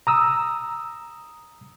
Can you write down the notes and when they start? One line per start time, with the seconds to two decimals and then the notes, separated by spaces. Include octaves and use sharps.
0.07 A#5 D#6 E6